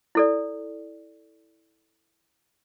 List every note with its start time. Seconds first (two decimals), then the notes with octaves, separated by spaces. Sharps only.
0.15 E4 A4 D5